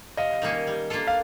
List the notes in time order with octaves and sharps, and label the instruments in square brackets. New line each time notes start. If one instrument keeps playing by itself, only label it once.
[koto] C3 [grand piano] D#5 F5
[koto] D#3 G3 A#3 C#4
G3
A#3 D4 F4 A4
[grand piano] F5